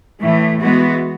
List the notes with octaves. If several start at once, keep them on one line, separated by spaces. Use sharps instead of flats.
A2 E3 A3
E3 G#3 B3 F#4